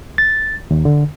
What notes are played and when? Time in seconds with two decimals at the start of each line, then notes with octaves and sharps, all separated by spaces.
0.18 A6
0.71 D#2
0.85 D3